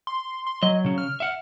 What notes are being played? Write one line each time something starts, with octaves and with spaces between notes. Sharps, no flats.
C6
C6
F#3 D#5
C#3 C#4
F6
E5 F#5